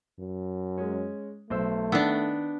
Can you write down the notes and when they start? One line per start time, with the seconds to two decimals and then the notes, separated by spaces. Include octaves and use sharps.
0.19 F#2
0.78 G#3 C#4
1.50 B1 A3 C5 E6
1.92 D#3 B3 D4 E6 F#6